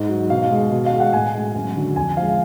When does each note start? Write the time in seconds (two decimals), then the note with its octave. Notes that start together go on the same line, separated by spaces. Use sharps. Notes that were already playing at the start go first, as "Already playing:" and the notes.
Already playing: G#2
0.09 F#3
0.30 B2 F5
0.51 G#3
0.72 B2
0.86 F5
0.93 G#3
1.00 F#5
1.13 A2 G#5
1.34 G#3
1.55 F#2
1.76 D3 F#3
1.96 F2 G#5
2.17 F3 G#3 F5